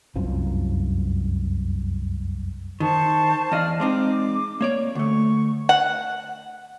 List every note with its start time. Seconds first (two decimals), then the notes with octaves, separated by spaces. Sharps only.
0.16 F1 C2 F#2 F3
2.80 D#3 C5 A5 C#6
3.52 E2 D5 D#5 F5 F6
3.80 G#3 C4 D#4 D6
4.61 A#3 C#5 D5
4.95 D2 A3 C#6
5.69 F#5